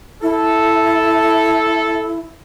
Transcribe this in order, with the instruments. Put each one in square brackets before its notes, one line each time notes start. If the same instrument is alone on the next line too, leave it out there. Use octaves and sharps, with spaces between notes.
[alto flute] E4 [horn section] A4